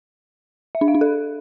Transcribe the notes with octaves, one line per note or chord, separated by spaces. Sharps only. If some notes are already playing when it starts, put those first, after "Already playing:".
E5
D4
F5
D4
A4